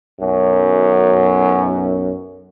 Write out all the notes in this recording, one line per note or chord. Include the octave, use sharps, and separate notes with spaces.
B1 F#2